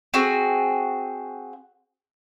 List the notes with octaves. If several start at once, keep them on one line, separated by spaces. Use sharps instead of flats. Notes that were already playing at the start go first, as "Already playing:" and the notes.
C4 F#4 G#4